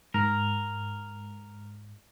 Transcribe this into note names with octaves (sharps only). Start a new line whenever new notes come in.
G#2 A#4